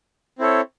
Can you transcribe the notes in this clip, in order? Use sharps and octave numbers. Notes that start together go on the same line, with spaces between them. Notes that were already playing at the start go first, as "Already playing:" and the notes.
C4 E4 A4 C#5